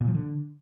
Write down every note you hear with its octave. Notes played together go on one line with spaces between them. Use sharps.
A#2
F3
D3